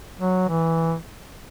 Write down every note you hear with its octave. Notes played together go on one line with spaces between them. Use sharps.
F#3
E3